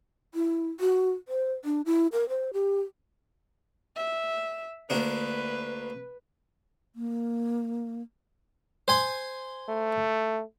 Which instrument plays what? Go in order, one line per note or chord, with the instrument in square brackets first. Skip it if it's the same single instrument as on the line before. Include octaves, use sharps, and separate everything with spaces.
[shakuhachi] E4
F#4
C5
D4
E4
A#4
C5
G4
[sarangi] E5
[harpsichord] D2 A#3 D4 [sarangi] B4
[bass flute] A#3
[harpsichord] C5 G#5 C6
[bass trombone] A3